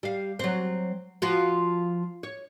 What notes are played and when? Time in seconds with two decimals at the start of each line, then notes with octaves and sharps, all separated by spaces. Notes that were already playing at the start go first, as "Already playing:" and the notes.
0.03 G3 F5
0.39 F#3 C4
1.22 F3 F4 F#4
2.23 C#5